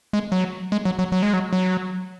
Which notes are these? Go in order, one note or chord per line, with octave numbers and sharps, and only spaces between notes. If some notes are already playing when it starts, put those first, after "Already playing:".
G#3
F#3
G#3
F#3
F#3
F#3
G#3
F#3
F#3